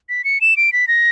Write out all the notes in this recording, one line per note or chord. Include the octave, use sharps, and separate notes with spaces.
B6
C#7
E7
D7
B6
A#6